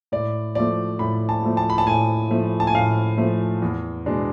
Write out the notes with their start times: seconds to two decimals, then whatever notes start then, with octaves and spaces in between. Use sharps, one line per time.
0.12 A2 D5
0.55 F3 A3 D5
0.99 A2 B5
1.29 A5
1.43 F3 A3
1.57 A5
1.70 B5
1.78 A5
1.86 A2 G#5
2.30 F3 A3
2.60 A5
2.67 G#5
2.75 A2 F5
3.18 F3 A3
3.62 E2
4.06 B2 G#3 D4